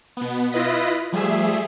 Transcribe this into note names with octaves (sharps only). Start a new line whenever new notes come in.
B2 B3
E4 F4 B4 D#5 A#6 B6
F3 G3 A3 G#4 E5